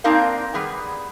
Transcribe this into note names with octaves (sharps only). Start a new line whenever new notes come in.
A#3 C4 D4 D#4 A#4 F5
G3 B3 G#4